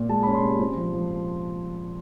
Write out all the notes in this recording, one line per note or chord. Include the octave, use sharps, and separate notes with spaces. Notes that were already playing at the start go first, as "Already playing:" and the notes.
Already playing: A#2
G#3 A5
C#4 B5
C6
C3
C4
F3
F3